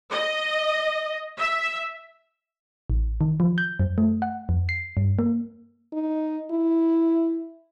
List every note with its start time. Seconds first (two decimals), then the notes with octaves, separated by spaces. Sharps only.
0.11 D#5
1.38 E5
2.90 A1
3.21 D#3
3.40 F3
3.58 G6
3.79 F#2
3.98 A3
4.22 F#5
4.49 F2
4.69 C7
4.97 G2
5.19 A#3
5.93 D#4
6.51 E4